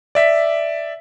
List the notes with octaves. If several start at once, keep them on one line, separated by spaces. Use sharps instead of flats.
D5 E5 B6